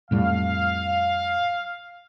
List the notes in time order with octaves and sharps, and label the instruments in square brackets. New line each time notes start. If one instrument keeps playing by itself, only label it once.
[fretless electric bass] F2 A2 G3 [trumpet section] F5